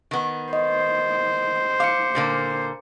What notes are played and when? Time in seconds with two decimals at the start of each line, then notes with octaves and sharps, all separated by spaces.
0.11 D#3 B3
0.53 C5 D#5
1.80 F5 D6 C#7
2.15 A#2 D3 A#3